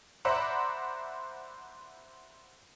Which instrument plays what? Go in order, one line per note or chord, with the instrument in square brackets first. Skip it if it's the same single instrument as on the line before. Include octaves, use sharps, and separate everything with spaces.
[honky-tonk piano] C5 D5 E5 F#5 A#5 B5